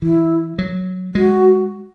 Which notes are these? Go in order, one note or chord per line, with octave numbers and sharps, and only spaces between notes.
E3 E4
F#3
G#3 F#4